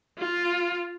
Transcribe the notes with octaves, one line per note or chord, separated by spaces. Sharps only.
F4